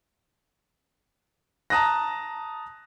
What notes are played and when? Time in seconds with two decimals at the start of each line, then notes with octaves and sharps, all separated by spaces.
1.70 A5 A#5 D#6 F#6 A#6